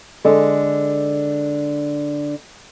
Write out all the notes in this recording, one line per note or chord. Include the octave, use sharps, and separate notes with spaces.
D3 G#3